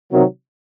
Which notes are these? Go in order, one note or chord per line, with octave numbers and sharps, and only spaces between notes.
C3 D#3 F#3